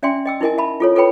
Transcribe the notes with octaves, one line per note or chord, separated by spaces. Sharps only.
C#4 D5 E5 G5 G#5 C6
D#5 G5 E6
D#4 E4 A#4 D#5 G#5
E5 A5 B5
F4 A4 C#5
F4 A4 B4 C#5 G5 B5